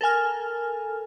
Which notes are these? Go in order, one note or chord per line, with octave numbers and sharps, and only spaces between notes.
A4 A#4 G#5 F6